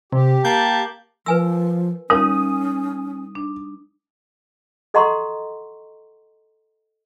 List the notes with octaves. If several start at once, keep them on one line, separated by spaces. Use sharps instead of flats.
C3 G4
A#3 A5 G6
F3 A#4 B4 G#5 E6
G3 C#4 D#4 A#4 C#5 F5 D#6
D4
A4 D#5 F#5 A#5 C6 C#6